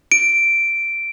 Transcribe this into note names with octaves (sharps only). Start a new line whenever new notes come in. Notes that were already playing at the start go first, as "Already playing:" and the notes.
D7